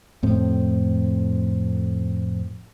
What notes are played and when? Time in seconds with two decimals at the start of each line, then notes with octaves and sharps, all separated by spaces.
0.23 F2 A2 C4